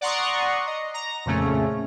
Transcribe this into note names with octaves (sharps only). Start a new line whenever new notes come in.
D5 F#5 A#5 C6 C#6 D#6
D#5
A#5
F2 A#2 C#3 A3 C#4